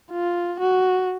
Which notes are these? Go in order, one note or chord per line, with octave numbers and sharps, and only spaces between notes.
F4
F#4